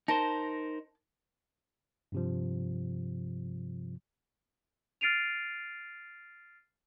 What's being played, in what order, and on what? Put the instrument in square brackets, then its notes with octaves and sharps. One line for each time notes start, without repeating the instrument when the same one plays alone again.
[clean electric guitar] D#4 A#4 C5 [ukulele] A5
[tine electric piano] G2 C3 F3
[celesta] F6 A6 C7 D7 D#7 F7